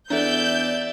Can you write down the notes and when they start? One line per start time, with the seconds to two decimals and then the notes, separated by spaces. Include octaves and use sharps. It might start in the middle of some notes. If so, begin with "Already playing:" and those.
0.10 E2 D4 A4 D5 E5 G6